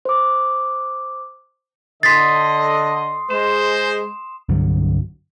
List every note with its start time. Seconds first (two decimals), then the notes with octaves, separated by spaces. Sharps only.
0.05 C5 D6
2.03 D3 D#5 C6 D#6 A6 B6 C7
3.30 G#3 C5 E7
4.49 C2 G2 D3 F#3